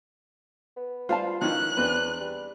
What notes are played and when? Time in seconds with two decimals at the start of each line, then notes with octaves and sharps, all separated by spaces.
0.77 B3
1.09 G3 F4 C5 F5 A5
1.41 D#3 F3 C#4 E4 F#6
1.77 E2 C4 D4 B4
2.21 G3